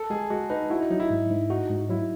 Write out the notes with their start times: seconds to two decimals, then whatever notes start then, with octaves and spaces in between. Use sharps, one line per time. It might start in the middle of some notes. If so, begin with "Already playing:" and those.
Already playing: A4
0.10 G#3 G#4
0.30 G#3 F#4
0.50 D#4 B4
0.70 E4 F#4
0.80 D#4
0.90 F#3 D#4
1.00 E4
1.10 G#2
1.30 G#2
1.50 D#4 F#4
1.70 G#2
1.89 F#3 E4